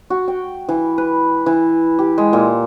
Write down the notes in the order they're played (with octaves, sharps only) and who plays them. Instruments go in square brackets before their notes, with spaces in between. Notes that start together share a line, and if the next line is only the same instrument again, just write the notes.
[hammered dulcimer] F#4
G5
E3
B4
E3
G4
G#3
A#2